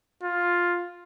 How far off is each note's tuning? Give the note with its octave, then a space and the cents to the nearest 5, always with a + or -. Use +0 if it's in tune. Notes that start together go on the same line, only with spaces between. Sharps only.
F4 +5